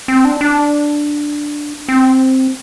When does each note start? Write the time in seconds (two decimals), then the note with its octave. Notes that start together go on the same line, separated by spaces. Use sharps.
0.08 C4
0.25 D4
0.41 D4
1.88 C4